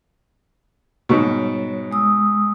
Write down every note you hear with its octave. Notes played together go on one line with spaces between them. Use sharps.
G#2 B2 G3 C#5
G#3 D#6 E6